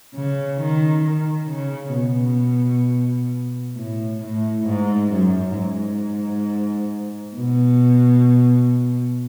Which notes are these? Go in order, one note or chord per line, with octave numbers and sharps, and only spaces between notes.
C#3
D#3
D#3
C#3
B2
A2
A2
G#2
F#2
G#2
B2